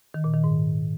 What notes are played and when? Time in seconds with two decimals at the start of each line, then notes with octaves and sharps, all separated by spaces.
0.14 D#3
0.24 A#2
0.34 D#3
0.44 G#2